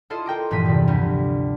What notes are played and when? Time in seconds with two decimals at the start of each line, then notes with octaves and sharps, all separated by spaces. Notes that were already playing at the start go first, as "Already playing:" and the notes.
0.10 E4 F4 A4 C5 D#5
0.26 A#4 G5 A#5 D6
0.51 G1 A#2 E3 F3 B6 D#7
0.66 E2 C3
0.88 D2 G3